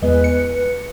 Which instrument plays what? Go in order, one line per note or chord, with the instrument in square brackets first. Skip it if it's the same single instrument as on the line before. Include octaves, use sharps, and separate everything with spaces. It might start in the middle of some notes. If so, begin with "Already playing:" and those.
[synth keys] E2 G#3 [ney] B4
[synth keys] C#7